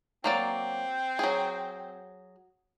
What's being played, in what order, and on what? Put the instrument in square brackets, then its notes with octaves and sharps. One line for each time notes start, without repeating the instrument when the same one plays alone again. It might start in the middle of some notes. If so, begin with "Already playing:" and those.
[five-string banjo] F#3 A#3 D5 [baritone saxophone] C4
[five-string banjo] F#3 G#4